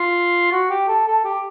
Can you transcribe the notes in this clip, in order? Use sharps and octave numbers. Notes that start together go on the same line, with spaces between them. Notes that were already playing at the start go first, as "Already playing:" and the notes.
Already playing: F4
F#4
G4
A4
A4
G4